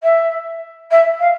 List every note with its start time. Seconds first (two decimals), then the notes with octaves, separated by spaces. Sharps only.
0.03 E5
0.91 E5
1.19 F5